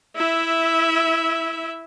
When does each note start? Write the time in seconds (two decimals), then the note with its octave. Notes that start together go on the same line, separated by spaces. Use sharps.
0.16 E4 E5